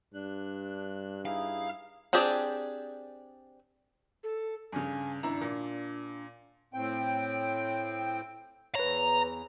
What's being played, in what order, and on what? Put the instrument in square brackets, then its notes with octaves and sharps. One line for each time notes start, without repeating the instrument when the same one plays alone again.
[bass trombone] G2 [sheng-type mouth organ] D4 F#6
[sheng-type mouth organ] D#4 E4 G#4 [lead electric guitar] F5
[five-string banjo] C4 D4 G4 G#4 D5
[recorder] A4
[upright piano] G2 C#3 [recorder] G#5
[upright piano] G#1 E4 A#5 [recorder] D4
[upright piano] A#2
[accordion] A2 C4 G5
[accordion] E2 [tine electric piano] B4 C#5 [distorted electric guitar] A#5